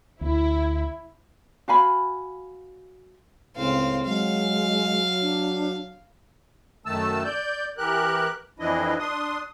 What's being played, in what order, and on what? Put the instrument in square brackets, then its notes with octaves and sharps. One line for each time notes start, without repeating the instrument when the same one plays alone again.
[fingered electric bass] D2 [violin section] E4
[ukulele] F#4 F5 G#5 B5
[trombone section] C#2 A2 C#3 [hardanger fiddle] C4 F5
[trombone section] F#3 [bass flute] G#3 [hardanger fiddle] F5
[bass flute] D4
[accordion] F#2 D#3 A3 A5 E6
D5 G6
E3 G4 A#4 F#6
F2 E3 F3 D4 E4 D#5
D4 C6 D#6